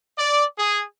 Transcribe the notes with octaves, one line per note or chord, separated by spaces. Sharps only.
D5
G#4